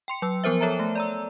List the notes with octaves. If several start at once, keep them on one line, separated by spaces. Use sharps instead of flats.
G5 C6 C#7
F#3 E6
F3 B3 A#4 C5 E5
A4 C#5 E5 A5 A#5
A3
D5 A#5 E6